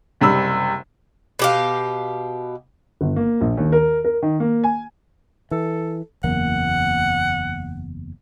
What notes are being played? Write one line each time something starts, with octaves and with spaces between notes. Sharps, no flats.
F#1 C3 G3 B5 E6
B2 G4 F5
G1
A#3
A#1
D#2
A#4
A#4
D#3
A#3
G#5
E3 A4
F#1 E2 A#3 F#5